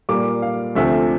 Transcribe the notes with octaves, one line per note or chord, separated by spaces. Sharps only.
A#2 G3 A#3 D6
F5
D2 C3 F3 A3 E5